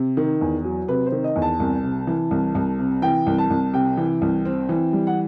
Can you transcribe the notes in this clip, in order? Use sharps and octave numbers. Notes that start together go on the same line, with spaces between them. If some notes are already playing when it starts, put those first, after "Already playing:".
Already playing: C3
D#3
E2
F#3
C3 B4
C5
D#3
D#5
E2
A5
C2
C3
E3
C2
C2
C3
E3 G5
C2
A5
C2
C3 G5
E3
C2
C4
E3
G3
F#5